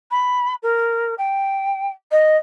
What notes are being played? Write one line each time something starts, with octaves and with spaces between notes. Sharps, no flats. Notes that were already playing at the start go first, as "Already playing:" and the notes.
B5
A#4
G5
D#5